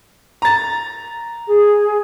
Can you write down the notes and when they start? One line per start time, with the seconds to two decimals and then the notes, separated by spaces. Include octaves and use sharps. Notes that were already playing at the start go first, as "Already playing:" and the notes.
0.42 A#5 A6
1.47 G#4